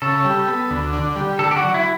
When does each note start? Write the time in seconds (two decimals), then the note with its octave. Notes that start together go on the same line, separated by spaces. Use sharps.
0.02 C#3 A4
0.24 G3
0.48 B3
0.71 D2
0.93 D3
1.16 G3
1.39 D3 A4
1.51 G4
1.56 F#4
1.63 F#3
1.74 E4